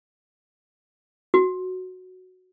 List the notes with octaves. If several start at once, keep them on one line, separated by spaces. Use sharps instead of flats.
F#4